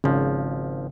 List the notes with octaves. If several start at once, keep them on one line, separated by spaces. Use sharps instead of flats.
G#1 C#3 F3